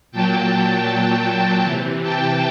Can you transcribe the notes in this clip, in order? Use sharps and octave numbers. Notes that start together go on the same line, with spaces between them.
A#2 F#3 G5 A5
C3 E3
G5 A5